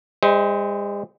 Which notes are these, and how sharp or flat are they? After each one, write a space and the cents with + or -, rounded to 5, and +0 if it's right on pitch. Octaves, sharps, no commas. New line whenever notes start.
G#3 -45 C5 -10 D#5 +40